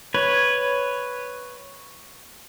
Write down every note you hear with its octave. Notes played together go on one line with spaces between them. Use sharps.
B4 C#5